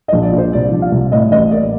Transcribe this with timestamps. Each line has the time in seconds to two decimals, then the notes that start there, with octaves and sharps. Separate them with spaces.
0.08 D#5
0.13 A#1
0.23 D5
0.32 A#2
0.38 C5
0.53 C2 D5
0.72 F3
0.82 F5
0.92 C2
1.12 A2 D#5
1.32 A1 D#5
1.51 A#3 D5